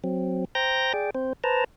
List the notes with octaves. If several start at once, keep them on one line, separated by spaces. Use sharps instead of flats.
F#3 C4
C5 G5 A#5 G6 A#6
G#4 D5 G5
C4 C5
B4 C5 A5 A#5